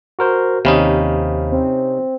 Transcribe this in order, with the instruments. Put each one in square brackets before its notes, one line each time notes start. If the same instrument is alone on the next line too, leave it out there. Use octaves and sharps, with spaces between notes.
[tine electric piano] F#4 A#4 C5
[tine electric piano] D#2 F5 B5 [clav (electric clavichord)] C3 C#4 D#4
[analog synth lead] C4